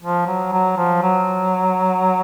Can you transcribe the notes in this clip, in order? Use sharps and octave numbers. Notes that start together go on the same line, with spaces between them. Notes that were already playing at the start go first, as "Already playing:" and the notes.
F3
F#3
F#3
F3
F#3